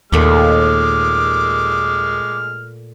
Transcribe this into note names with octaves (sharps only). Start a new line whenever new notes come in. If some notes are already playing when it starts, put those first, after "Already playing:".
D#2 A#2 G#3 A3 D6 F6